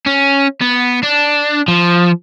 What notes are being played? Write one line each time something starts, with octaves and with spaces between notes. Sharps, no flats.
C#4
B3
D4
F3